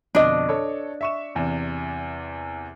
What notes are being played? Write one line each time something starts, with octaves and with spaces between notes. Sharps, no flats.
F2 B2 D3 D4 D#5
A4 C#5
E5 C#6 E7
E2 C3